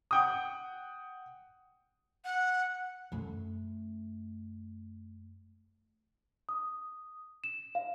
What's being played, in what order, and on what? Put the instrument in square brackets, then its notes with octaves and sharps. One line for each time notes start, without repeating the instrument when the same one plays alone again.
[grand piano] F#5 G5 D#6
[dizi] F#5
[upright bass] F#2 A3
[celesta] D#6
E7
F5